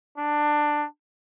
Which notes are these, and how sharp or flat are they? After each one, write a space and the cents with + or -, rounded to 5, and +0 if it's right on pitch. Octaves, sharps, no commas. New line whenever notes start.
D4 +15